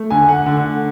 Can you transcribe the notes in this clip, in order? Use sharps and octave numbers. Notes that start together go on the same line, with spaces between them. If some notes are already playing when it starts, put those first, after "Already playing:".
Already playing: A3
D3 G#5
F#5
D3